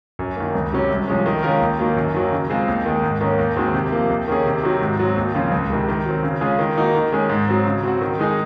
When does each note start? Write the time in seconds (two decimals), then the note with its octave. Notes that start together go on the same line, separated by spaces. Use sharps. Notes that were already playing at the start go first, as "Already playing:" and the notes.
0.19 F#2
0.37 D#3 A#3
0.55 C#2
0.72 C3 F#3 C#4
0.90 C2
1.08 C3 F3 G#3 C#4
1.26 D#3
1.43 G#3 C#4 F4 A#4
1.61 D#2
1.79 D#3 F#3 A#3
1.97 F#2
2.14 D#3 F#3 A#3
2.32 C#3
2.50 G#3 C4 F4 G#4
2.68 D#2
2.86 D#3 G#3
3.03 G#2
3.21 D#3 A#3 C#4
3.39 D#2
3.56 D#3 G#3 C4 F#4
3.74 C3
3.92 F3 A#3
4.10 D#2
4.28 D#3 A#3 C#4 G#4
4.46 C3
4.63 D#3 F#3
4.81 G#2
4.99 F#3 C4
5.17 D#2
5.35 C#3 F3 C4 F4
5.52 C#2
5.70 C3 D#3 G#3
5.88 D#3
6.06 F#3 C4
6.23 C#3
6.41 G#3 C#4 F4 G#4
6.59 D#3
6.77 A#3 D#4 F#4
6.95 D#3
7.12 G#3 C#4 G#4
7.30 G#2
7.48 F#3 C4
7.66 C#3
7.83 F#3 C4 F#4
8.01 D#3
8.19 G#3 D#4 G#4